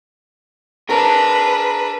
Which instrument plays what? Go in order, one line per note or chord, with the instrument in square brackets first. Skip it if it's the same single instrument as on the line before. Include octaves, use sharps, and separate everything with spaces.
[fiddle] D4 B4 [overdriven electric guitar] G#4 A#4